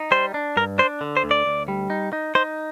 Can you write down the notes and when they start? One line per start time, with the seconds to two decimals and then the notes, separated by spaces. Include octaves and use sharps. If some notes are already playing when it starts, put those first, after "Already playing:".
Already playing: D#4
0.11 G3 C5
0.34 D4
0.57 G2 A#4
0.78 D4 C5
1.01 D3
1.17 C5
1.24 D2
1.31 D5
1.46 D2
1.68 G3
1.90 D#4
2.13 D#4
2.35 D#4 C5